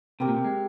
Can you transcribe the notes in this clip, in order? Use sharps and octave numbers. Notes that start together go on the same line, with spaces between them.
C3 C4 G4 A#4
A#2
C3
G#3